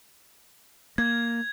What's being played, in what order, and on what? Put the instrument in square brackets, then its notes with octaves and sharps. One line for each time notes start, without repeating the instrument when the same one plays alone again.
[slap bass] A#3 [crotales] G#6